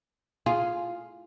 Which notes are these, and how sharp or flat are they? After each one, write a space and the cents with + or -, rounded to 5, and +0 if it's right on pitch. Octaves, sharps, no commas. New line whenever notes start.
F4 +0 G#4 +0